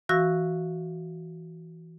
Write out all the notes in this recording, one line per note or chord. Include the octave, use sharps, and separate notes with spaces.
E3 F#4 F5 C#6 E6 A#6